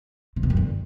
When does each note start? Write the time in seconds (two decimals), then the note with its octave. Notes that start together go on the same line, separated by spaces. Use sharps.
0.36 C3
0.43 B2
0.50 F#2
0.57 D3